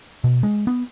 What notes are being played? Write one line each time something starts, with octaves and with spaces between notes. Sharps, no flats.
B2
G#3
B3